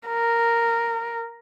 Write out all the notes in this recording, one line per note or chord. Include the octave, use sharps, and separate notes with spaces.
A#4